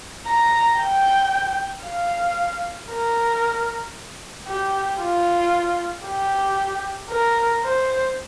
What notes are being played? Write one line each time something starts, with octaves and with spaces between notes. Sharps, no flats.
A#5
G5
F5
A#4
G4
F4
G4
A#4
C5